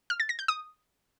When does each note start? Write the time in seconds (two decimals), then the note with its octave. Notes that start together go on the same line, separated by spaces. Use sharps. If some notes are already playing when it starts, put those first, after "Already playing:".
0.10 F6
0.20 A6
0.29 A#6
0.39 G6
0.48 D#6